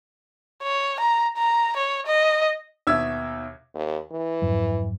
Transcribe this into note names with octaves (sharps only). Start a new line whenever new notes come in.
C#5
A#5
A#5
C#5
D#5
D#2 B2 E5 E6 G#6
D#2
E3
F2 G#2 F#3